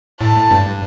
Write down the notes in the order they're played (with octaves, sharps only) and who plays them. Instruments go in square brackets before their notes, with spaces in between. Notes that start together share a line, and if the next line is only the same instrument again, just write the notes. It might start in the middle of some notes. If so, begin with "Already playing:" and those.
[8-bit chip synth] A2 [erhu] A5
[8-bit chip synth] G2